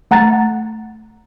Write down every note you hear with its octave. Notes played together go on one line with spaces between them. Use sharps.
A3 F#5 A#5 F#6 A6